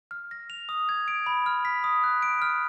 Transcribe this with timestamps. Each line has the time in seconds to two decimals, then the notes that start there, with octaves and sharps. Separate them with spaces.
0.11 F6
0.31 A#6
0.50 F7
0.69 D#6
0.89 G#6
1.08 D7
1.26 B5
1.46 F6
1.65 B6
1.84 D#6
2.04 F#6
2.22 D7
2.42 F6